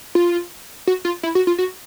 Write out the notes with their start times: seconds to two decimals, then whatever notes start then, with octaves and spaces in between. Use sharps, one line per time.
0.15 F4
0.87 F#4
1.05 F4
1.23 E4
1.35 F#4
1.47 F4
1.58 F#4